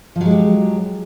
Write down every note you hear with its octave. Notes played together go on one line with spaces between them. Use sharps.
F3 F#3 G#3 G4